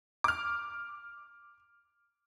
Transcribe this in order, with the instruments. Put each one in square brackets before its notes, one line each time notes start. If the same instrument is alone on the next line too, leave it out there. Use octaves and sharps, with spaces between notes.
[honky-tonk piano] D6 F6